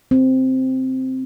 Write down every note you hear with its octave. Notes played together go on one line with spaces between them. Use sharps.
C4